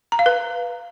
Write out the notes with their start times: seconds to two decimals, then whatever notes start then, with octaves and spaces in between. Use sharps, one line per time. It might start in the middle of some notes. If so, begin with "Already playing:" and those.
0.12 A#5
0.19 F5
0.26 B4